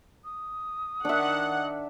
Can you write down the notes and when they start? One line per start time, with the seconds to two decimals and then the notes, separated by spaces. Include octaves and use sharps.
0.24 D#6
1.05 D#3 D4 E5 F#5